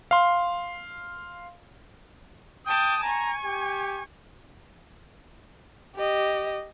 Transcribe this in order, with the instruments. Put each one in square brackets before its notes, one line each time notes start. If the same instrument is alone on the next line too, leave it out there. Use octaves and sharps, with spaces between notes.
[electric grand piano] F5 C6
[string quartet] G5 A5 D6 [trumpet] D#6
[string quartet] G#5 C#6 [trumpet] A#5
[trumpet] G4
[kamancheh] G4 D#5